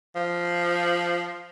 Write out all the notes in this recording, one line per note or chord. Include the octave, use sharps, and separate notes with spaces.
F3